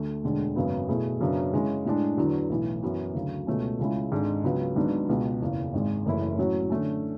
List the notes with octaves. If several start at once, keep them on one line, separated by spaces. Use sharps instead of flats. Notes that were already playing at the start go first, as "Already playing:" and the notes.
Already playing: D2 A3
E1 D2 D3 G#3
G#1 F#2 C#3 F#3 B3
B2 A3 E4 G#4
F#2 C#3 F#3 B3 D4
C#3 G#3 C#4 E4
A2 G#3 D4
E2 D3 F#3 B3
B1 A2 E3
F#2 E3 B3 F#4
D2 C#3 F#3
C#2 B2 A3 C#4
C#2 C#3 G#3 C#4 E4
G#1 G#2 G#3 D4 A4
C#2 C#3 F#3 B3
G#1 G#2 F#3 B3 D4
C#2 B2 G#3
F#1 E2 C#3
G#1 G#2 G#3
F#1 F#2 E3 A3 E4
A2 F#3 C#4 F#4 C#5
D3 A3 C#4